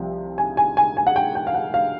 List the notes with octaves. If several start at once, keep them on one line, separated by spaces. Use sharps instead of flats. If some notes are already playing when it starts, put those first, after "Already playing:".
Already playing: C2 C3 F3
G#5
G#5
G#5
G#5
F#5
G5
G5
F5
F#5
F5